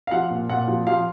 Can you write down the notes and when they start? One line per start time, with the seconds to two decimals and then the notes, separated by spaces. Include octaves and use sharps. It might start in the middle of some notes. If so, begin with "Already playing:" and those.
0.07 F5
0.11 F3 F#5
0.30 A#2
0.49 A#2 F#5
0.68 F3
0.87 F3 F5